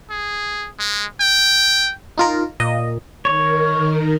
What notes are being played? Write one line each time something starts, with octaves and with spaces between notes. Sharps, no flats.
G#4
G#3
G5
D#4 F4 A#4
A#2 D#5
D#3 A#4 C#5